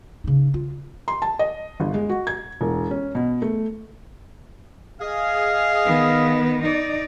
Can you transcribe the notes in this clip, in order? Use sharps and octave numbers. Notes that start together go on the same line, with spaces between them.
C#3 D#4
F4
C6
A5
D#5
G1
G#3
F#4
G#6
E1
C#4
B2
A3
G#4 D#5 F5
D#3 B3
D#4 D5